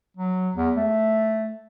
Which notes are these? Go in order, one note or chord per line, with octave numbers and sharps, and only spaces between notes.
F#3
E2
A3